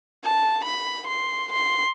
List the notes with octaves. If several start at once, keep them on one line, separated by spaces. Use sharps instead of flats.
A5
B5
C6
C6